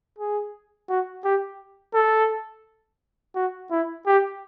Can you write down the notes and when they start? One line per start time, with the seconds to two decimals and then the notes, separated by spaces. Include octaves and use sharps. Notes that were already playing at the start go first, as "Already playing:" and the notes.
0.18 G#4
0.89 F#4
1.25 G4
1.94 A4
3.35 F#4
3.71 E4
4.07 G4